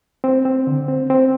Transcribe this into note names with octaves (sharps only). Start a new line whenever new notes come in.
C4
C4
D3
C4
C4